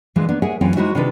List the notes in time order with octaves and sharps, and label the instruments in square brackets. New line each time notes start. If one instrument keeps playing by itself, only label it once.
[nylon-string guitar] A#2 D3 E3 F3 G#3
A#3 B3 D4
G#4 A#4 C#5 E5 F#5 G#5
F#2 E3 C4 C#4 F4 G5
G#3 D#4 E4 F#4 C5 E5
C3 D#3 D4 F4 A4 B4